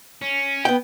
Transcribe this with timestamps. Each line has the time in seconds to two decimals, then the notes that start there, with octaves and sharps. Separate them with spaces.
0.22 C#4
0.65 B3 G5